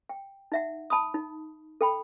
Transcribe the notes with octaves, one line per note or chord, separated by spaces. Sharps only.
G5
D#4 E5 F#5
A5 B5 D#6
D#4
A4 G5 B5